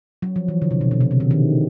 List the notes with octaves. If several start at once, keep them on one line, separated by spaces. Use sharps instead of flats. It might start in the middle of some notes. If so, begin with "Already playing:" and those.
F#3
F3
E3
D3
C3
B2
B2
C3
C#3
D3
D#3